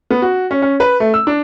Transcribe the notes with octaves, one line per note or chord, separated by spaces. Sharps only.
B3
F#4
C#4
C#4
B4
A3
E6
D4